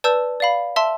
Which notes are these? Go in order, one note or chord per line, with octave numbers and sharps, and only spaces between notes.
B4 D5 A5 E6 G6
D5 F5 B5
E5 A5 C6 E6